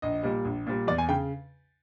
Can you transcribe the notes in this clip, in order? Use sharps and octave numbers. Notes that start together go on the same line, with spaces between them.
A#1 D#5
A#2 G3
A#1
A#2 G3
E2 D5
G#5
C#3 G5